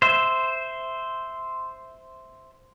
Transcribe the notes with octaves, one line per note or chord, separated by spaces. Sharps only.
C5 E5